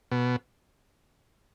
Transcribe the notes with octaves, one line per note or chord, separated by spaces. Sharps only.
B2